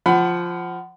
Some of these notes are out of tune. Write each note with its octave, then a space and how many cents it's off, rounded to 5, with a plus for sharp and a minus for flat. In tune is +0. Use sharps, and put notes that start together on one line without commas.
F3 +0 F#5 +20 B5 +30